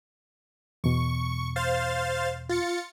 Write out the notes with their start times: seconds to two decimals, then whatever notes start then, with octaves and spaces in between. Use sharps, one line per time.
0.84 E2 B2 C#6
1.56 C5 F5 A6
2.49 F4 A6 C#7